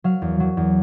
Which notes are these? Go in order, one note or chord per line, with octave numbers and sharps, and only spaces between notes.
F#3 F5
E2
F#3
E2